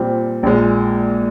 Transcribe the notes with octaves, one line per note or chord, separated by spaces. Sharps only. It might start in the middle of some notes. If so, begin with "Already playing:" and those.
Already playing: A#2 G3 C4
A#1 A#2 G#3